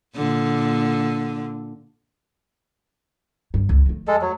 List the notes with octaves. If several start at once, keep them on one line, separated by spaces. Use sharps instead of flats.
A#2 D3
G2
C#2
F2 A3
G#3 A4
F#3